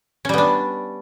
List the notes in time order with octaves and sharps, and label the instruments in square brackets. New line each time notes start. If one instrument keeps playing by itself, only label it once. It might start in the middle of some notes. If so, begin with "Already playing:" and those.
[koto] C#4
G3
B3
D4